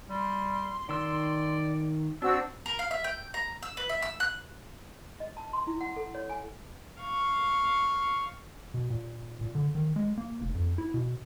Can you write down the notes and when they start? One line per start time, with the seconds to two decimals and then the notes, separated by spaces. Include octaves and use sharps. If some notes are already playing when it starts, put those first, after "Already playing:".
0.10 G3 C6
0.89 D#3 D5 E6
2.22 C4 D4 F#4 E6
2.66 A#4
2.79 F5
2.91 E5
3.04 G5
3.34 A#5
3.63 E6
3.77 B4
3.89 E5
4.02 E6
4.20 F#6
5.20 D#5
5.37 A5
5.53 C6
5.67 E4
5.81 F#5
5.96 A4
6.15 C#5
6.30 G#5
7.01 F5 C#6
8.74 B2
8.90 A#2
9.41 A#2
9.55 D3
9.75 D#3
9.96 G#3
10.18 A#3
10.41 F1
10.55 F2
10.78 E4
10.94 B2